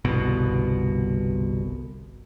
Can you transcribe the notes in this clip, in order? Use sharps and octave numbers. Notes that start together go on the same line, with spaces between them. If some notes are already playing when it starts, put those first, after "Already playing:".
G1 C2 B2